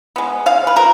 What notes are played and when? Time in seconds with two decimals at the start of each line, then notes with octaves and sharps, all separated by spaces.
0.16 G#3 B3
0.46 C#3 F5
0.67 B4
0.76 F3 A#4